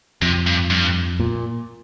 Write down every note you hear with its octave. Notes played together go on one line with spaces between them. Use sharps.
F2 C3
G2
G2
A#2